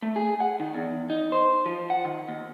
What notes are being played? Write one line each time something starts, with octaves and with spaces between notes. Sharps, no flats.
A3
G#4
F#5
D#3
E2
D#4
C5
F3
F#5
D#3
D#2